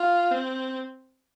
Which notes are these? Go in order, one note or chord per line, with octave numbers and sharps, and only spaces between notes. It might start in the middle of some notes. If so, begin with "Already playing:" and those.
Already playing: F4
C4